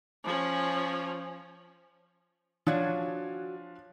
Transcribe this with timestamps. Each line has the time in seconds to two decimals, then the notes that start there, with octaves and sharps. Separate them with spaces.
0.24 F3 C#4
2.67 F3 F#3 D4 F#4 G#5